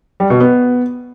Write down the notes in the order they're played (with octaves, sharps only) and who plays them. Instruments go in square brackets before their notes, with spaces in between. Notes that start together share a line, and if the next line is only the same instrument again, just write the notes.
[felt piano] G3
B2
B3